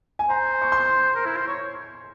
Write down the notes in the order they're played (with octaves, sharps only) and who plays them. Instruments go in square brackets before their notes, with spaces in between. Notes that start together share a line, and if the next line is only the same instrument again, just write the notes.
[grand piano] G#5
[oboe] C5 [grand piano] A#5
[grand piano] C#6
C6
[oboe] A#4
E4
C5
C#5